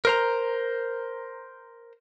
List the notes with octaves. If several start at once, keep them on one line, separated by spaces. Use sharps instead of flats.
A#4 C5 A#5